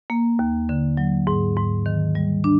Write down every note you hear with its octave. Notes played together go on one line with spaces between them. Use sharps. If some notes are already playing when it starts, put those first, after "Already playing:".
A#3
D#2
D3
F#3
G#2
G#2
D#3
G3
D4